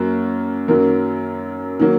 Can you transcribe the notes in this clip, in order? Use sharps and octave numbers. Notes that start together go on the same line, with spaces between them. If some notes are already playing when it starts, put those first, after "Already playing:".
Already playing: F#2 A#3 F#4
F#2 D#3 F#3 A#3 A#4
D#3 F#3 A#3